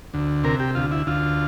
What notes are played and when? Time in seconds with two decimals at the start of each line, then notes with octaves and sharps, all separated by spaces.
0.14 D2
0.44 C3 A#4
0.60 G4
0.75 D2 F4
0.91 E4
1.07 D2 F4